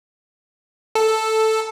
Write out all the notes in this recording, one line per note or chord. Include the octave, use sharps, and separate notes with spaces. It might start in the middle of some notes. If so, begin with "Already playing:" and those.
A4